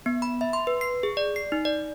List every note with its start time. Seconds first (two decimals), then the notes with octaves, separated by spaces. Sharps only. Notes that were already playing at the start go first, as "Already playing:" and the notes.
0.06 B3
0.22 B5
0.41 E5
0.53 C6
0.67 B4
0.81 C7
1.03 G#4
1.17 D5
1.36 C7
1.52 D#4
1.65 D5